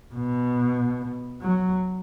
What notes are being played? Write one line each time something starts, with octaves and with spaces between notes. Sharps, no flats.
B2
F#3